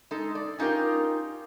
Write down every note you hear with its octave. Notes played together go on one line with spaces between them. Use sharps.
G#3 D#4 A4
D5
C#4 D#4 F4 G4 A#4